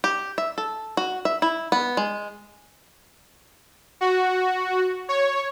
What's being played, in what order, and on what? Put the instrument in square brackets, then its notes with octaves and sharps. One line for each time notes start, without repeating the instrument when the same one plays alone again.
[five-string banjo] G4
E5
A4
F#4
E5
E4
B3
G#3
[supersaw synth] F#4
C#5